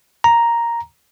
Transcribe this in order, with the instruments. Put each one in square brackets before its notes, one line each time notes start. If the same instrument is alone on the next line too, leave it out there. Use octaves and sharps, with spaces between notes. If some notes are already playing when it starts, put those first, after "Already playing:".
[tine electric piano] A#5